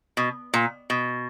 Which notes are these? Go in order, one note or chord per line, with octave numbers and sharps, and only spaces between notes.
B2
A#2
B2